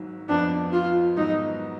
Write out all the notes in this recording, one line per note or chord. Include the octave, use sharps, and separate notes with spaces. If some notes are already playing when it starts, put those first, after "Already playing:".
Already playing: G#1 G#2 F#3
F2 F3 B3 D4
F4
G#2 D#3 F#3 B3 D#4